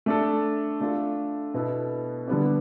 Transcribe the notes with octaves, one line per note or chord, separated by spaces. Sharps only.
A3 D4 A4
A3 D4 F4 A4
B2 B3 E4 A4
D3 G3 B3 D4